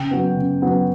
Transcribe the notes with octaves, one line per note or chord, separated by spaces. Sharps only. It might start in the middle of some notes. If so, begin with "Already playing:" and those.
Already playing: C#3 G5
F#3 B3
C#3
F#3 B3